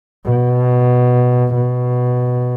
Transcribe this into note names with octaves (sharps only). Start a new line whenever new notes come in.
B2
B2